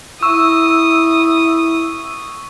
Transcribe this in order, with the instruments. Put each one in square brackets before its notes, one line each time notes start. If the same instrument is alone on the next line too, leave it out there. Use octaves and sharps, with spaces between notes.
[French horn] E4 [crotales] C#6 [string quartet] D#6 [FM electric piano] E6